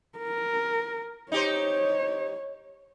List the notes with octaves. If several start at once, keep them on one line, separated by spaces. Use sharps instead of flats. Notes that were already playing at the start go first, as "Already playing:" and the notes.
A#4
D#4 G4 C5 C#5